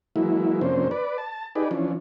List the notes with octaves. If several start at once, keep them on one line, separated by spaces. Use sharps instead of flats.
E3 F#3 G#3 A#3 E4
F2 C3 A#3 C#4 D4 C5
B4 D5
A5
D#4 G4 G#4 B4 D5
E3 F3 C#4 D4